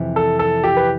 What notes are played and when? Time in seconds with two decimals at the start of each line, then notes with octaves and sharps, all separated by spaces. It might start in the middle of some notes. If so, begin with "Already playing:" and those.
Already playing: F2 C3 E3
0.16 A4
0.39 A4
0.64 G4
0.77 B4